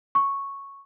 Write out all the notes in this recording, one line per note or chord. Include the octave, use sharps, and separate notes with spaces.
C#6